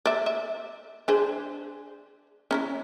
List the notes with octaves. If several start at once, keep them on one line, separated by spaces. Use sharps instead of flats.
D5 E5
E5
D4 G#4 C5
C#4 D#4 E4